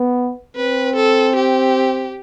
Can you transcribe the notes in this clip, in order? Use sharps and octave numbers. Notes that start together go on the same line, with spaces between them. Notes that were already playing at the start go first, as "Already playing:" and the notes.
Already playing: B3
C4 B4
A4
G4